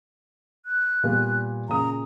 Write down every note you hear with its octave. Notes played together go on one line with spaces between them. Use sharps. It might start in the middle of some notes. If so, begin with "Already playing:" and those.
F#6
A#2 G3 B3
A#2 C#3 A#5 D#6